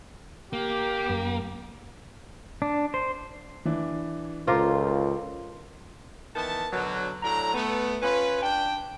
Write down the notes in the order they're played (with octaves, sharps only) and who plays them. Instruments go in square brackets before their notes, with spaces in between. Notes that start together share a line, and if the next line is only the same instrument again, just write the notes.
[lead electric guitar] A#3 [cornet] G4
[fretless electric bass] F#2
[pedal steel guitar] D4
C5
[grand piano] E3 D4
[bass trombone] C#2 [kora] F4 A#4 C5 [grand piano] A4 D6
[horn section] D#3 E3 B3 A5
B2 D3 F#3
A2 F#3 D4 A#5
A3 B3
C#4 F4 B4
D4 G5